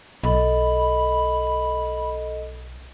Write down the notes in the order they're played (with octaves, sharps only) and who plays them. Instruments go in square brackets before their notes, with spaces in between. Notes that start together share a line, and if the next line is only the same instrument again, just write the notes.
[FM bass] B1 [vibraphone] A4 D#5 [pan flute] B5